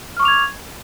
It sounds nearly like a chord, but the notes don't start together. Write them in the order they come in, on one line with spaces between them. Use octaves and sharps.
F6 C#6 D6 F7 G#6